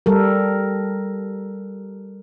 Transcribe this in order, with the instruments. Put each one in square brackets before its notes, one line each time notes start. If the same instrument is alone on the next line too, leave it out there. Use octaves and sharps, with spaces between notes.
[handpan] G3 A4 A#4